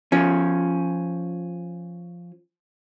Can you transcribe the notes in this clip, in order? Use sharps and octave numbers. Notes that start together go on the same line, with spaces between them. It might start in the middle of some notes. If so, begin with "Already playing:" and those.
F3 C#4